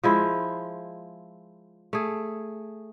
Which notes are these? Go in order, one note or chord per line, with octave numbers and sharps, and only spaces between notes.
F3 G#3 E4
A3 G#4